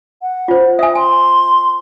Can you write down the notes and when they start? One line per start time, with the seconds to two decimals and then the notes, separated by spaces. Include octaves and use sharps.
0.22 F#5
0.48 F4 C5
0.79 E5 G#5 D#6
0.95 G#5 C6